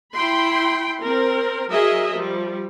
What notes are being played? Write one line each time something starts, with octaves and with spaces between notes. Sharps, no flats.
E4 G5 B5 C6
C4 A#4
F#3 G#4 A#4 D#5 E5
F3 G3